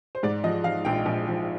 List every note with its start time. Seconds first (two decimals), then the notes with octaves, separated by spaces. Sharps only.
0.15 C5
0.23 G#2 D5
0.44 F3 D#5
0.64 F3 F5
0.85 A#1 G5
1.06 A#1
1.27 F3